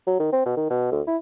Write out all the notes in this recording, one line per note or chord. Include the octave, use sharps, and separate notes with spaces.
F#3
D#3
C4
B2
D#3
B2
D2
E4